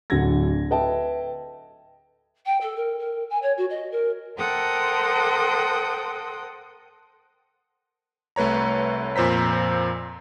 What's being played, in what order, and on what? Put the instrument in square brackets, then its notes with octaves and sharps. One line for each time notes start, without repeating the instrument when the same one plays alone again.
[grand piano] D1 D3 F#3 F#5 G#6 A#6
A4 B4 D#5 E5 G5 A5
[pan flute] G5
A4
A#4
A#4
G#5
C#5
F#4
D#5
A#4
[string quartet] A4 A#4 C5 F#5 G5 D#6
[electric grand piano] C2 A3 B4 C#5 A#5
F2 A#2 C5 A#5 B6